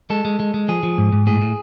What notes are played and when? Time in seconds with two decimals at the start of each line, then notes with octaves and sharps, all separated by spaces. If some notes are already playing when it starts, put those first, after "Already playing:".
0.10 G#3 A4
0.25 G#3
0.40 G#3
0.54 G#3
0.68 F3 G#4
0.83 F3
0.98 G#2
1.13 G#2
1.27 A2 G#4
1.42 A2